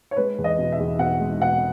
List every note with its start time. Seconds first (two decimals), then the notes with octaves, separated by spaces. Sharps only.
0.11 C#5
0.16 G#3 B4
0.38 E2
0.44 D#5
0.58 B2
0.72 E5
0.80 E2
0.99 B2 F#5
1.20 G#3
1.41 B2 F#5